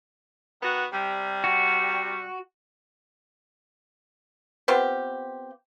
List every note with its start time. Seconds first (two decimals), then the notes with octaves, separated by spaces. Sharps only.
0.62 D#3 B3 F#4
0.93 C3 G3
1.44 F#4
4.68 B3 C4 F4 G4